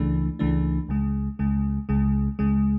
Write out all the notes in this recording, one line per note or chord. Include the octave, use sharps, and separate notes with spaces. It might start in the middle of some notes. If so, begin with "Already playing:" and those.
Already playing: C#2 C#3 E3 A3 D4
C#2 C#3 E3 A3 D4
C#2 C#3 G#3
C#2 C#3 G#3
C#2 C#3 G#3
C#2 C#3 G#3